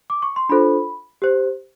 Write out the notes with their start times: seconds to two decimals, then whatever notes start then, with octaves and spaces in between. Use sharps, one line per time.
0.10 D6
0.22 C#6
0.36 C6
0.49 D4 F4 A4 C5 B5
1.22 G4 C5